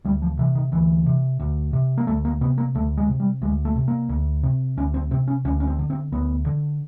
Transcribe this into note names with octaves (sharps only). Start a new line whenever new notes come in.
D2 G3
F3
C3 E3
D#3
D2 E3
C3
D2
C3
A#3
D2 A3
A#3
C3 B3
A#3
D2 A3
G#3
C3
G3
D2 G#3
A3
C3
A#3
D2
C3
D2 C#4
C4
C3 C4
C#4
D2 C#4
C#4
C4
D3
C4
D2 B3
D3